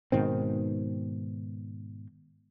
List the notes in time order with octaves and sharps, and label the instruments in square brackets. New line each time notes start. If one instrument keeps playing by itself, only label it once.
[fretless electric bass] G#2 B2 D#3 C4